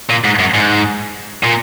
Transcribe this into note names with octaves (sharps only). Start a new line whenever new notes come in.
A#2
G#2
F#2
G#2
A#2